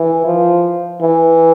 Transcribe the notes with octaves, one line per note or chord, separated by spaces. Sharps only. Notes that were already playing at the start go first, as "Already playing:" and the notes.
Already playing: E3
F3
E3